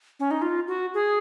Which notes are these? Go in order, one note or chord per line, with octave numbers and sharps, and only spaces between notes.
C#4
D#4
F4
F#4
G#4